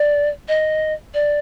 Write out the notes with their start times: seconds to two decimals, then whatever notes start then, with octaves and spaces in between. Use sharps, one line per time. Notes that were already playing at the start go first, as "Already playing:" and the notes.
Already playing: D5
0.48 D#5
1.14 D5